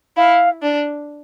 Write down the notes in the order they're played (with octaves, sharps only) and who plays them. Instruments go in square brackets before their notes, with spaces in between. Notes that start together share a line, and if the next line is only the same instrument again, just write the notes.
[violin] E4 [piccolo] F5
[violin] D4